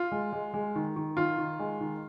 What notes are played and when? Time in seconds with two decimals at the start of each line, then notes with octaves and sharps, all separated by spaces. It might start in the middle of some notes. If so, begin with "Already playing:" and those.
Already playing: F4
0.12 G#3
0.33 G#3
0.54 G#3
0.76 D#3
0.96 D#3
1.17 D#3 F4
1.38 D#3
1.59 G#3
1.81 D#3